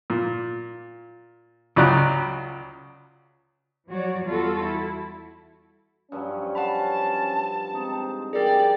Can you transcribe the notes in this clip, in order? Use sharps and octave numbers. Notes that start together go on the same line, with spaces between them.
A#2
C#2 C#3 F#3 D5 A#5 F#6
F3 F#3 F#4 C#5 D5
E2 G3 F4 F#4 A4
E4
G2 F3 F#3 C#4
F#5 A5 B5
G#3 C4 D#4
F2 C3 G4 G#4 A#4 D5 G5